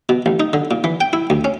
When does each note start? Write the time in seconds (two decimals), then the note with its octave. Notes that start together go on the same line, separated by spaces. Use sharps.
0.09 B2
0.26 A1
0.40 D#4
0.53 D3
0.71 A#2
0.84 E3
1.01 G5
1.13 E4
1.30 D2
1.44 C#4